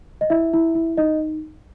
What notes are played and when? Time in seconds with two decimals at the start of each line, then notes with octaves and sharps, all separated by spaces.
0.21 D#5
0.30 E4 E5
0.54 E4
0.75 E4
0.97 D#4 D#5